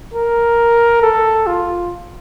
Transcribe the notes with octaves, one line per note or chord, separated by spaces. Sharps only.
A#4
A4
F4